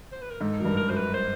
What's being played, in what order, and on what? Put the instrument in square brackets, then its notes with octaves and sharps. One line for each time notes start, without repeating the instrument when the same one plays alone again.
[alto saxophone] C5
B4
A#4
[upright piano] G#2 [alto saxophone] A4
[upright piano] F#2 [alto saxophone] A#4
[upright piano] G2
[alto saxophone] A#4
[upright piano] F#2 [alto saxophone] C5
[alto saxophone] B4
C5